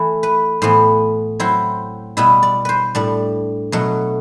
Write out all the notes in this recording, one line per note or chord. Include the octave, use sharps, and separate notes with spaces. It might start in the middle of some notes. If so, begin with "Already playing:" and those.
Already playing: E3 A3 E4
B4
A2 E3 B3 C5
F#3 C4 E4 C5
B2 G3 B3 E4 E5
D5
B4 C5
A2 G3 D4 D5
B2 F#3 A3